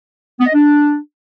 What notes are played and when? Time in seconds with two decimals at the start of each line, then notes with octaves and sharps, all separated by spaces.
0.39 B3
0.46 D#5
0.53 D4